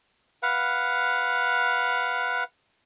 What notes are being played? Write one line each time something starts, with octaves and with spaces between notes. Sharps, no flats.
B4 F5 F#5